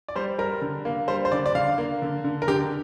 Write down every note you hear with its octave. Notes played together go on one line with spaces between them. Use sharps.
D5
G3 C5
G3 A#4
D3
A#3
G3 C5
C5
D3 D5
D5
D3 F5
A#3
D3
D3
A#4
D3 G4